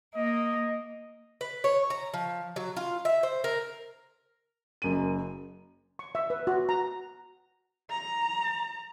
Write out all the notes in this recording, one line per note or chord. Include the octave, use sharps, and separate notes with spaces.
A#3 D#5
B4
C#5
A#5
F3
F#3
F4
E5
C5
A#4
F#1 F#2 D#7
C#6
E5
B4
F#4
A#5
A#5